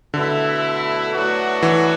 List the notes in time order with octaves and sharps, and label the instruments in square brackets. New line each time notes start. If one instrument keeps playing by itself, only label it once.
[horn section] B2 A3 E4 [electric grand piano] D3
[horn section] A2 F#3 B3 D4 F#4
[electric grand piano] E3